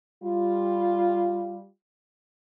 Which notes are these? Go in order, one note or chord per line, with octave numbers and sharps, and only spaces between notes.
G3 F4